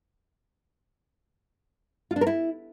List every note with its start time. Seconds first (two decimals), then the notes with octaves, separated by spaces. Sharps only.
2.11 F4
2.16 D4
2.21 A#4
2.27 E4